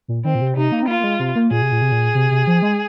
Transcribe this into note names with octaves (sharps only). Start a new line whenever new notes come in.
A#2
D#3 C4
A#2
C3
C3 D#4
A#3
C4
A#3 F4
A#3
G#3
C3
A#3
A#2 G#4
C3
A#2
C3
A#2
C3
C3
F3
G#3